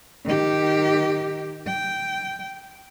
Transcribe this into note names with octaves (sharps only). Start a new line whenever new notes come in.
D#3 G4
G5